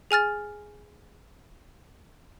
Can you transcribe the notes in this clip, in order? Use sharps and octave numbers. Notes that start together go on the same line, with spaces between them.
G#4 G#5 F6 A6